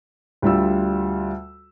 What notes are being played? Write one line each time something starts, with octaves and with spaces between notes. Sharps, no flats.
D2 G3 F4 E6